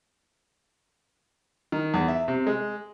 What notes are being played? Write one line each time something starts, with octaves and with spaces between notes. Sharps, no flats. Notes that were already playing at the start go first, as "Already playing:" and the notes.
D#3
E2
E5
C3
G#3